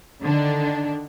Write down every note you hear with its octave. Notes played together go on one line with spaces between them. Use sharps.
D3 D#3 D4